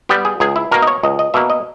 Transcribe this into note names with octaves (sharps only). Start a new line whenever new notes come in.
G3 B3 G4
G#4
C#2 G#4
E4
B2 A#3 A#4
D#5
C#5
C#2 D#5
D#5
B2 A#3 E5
D#5